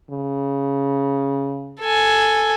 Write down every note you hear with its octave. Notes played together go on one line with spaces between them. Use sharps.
C#3
A4 G#5